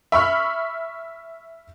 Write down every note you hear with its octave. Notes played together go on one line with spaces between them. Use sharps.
E5 B5 C#6 F6